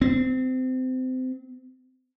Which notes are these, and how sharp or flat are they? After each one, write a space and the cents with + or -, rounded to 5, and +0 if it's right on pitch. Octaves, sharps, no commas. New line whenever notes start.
C4 -25